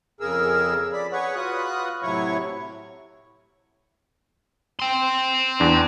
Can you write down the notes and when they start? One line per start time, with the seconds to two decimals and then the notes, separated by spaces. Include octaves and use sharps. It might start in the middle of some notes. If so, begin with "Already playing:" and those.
0.20 F2 C#3 G#4 A#4 E6
0.93 D5 B5
1.12 G#4 B4 C#5 F#5 C#6
1.35 F4 F#4 B4 D#6 F#6
2.03 A2 C3 F#3 E4 C#5 C#6
4.79 G5 C6
5.60 E2 D4